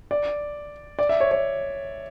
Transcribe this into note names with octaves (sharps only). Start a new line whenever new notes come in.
D5
D5
E5
C#5
C#5